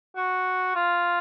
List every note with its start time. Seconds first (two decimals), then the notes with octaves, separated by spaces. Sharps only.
0.16 F#4
0.75 F4